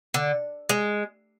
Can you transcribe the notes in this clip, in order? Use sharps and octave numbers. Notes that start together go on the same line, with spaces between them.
D3
G#3